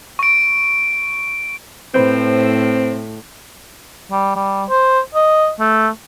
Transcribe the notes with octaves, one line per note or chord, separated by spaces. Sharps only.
C#6 D7
A2 C4 B4 C5 G6
G3
G3
C5
D#5
A3